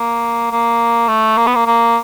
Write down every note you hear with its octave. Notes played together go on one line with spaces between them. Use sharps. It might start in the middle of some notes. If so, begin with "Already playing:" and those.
Already playing: A#3
A#3
A3
A#3
B3
A#3
A#3